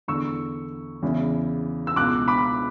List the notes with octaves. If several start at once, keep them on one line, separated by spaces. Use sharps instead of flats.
E2 D3 C#6 E6
E2 C#3 E3
E6
C#2 B2 D6 F#6
B5 D6